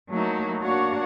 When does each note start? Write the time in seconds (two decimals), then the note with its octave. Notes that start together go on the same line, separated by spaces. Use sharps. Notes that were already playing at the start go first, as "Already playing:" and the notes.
0.11 F#3 A3 A#3 D#4 E4 F#4
0.62 A#3 D4 F#4 C#5 F5 F#5